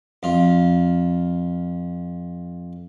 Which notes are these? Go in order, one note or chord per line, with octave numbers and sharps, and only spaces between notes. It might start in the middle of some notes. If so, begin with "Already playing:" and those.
F2 F4